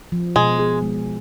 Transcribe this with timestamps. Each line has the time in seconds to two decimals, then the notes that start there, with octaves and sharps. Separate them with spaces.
0.12 F3
0.36 B2 G#3
0.59 G#4
0.82 G#3